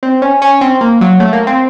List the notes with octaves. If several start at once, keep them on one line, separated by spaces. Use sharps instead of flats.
C4
C#4
C#4
C4
A#3
F#3
A3
A#3
C4